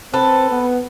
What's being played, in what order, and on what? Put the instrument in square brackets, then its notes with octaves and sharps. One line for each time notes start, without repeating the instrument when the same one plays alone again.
[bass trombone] C4 [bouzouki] A4 B4
[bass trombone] B3